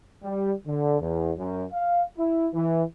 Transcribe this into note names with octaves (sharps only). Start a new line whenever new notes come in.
G3
D3
E2
F#2
F5
E4
E3